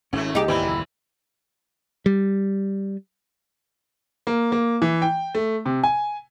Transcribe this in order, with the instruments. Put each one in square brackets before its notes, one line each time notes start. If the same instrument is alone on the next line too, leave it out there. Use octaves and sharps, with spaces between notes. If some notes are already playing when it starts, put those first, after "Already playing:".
[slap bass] G#1 C#4 [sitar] G#2 A3
[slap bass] C2 [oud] D#4 G4 [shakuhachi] G#4
[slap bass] D#2 G#2 [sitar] E3 G3 C4 [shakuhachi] E4
[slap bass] F#1 D#2 A#2
[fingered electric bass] G3
[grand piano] A#3
A#3
E3
G5
A3
C3
G#5